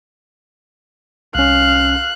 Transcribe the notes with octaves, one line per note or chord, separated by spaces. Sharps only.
C2 C#4 F5 F#6